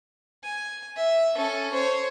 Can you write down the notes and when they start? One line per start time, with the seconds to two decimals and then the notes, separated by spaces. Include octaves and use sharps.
0.43 G#5
0.96 E5
1.35 C#4 A4
1.73 C5 C#5